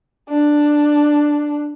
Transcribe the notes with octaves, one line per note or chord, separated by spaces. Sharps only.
D4